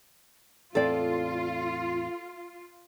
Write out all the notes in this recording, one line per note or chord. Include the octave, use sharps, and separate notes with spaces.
E2 A2 C4 F4 A4 D5